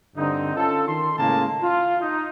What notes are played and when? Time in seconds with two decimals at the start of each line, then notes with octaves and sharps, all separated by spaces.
0.16 G2 D3 C4 D#4
0.56 C#4 F4 A4
0.87 D#3 C6
1.18 A2 C#3 G#3 A#3 A5
1.62 F4
2.00 D#4